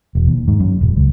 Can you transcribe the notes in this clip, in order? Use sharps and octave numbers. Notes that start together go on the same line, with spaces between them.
E1
D#2
G#2
F#2
D#1
C#2